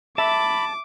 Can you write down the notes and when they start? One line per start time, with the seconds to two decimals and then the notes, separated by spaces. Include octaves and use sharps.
0.18 E5 A5 B5 D6